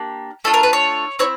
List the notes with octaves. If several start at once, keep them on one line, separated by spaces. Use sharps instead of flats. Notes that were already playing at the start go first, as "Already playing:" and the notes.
Already playing: A#3 D4 G4
A3 D4 F4 A4
A#4
B4
C#5
C4 E4 C#5